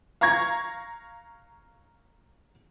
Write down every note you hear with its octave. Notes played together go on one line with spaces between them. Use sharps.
F5 A#5 C#6 G#6 A#6